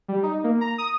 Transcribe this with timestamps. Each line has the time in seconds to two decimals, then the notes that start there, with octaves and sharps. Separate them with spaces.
0.08 G3
0.23 D#4
0.44 A#3
0.61 A#5
0.78 D#6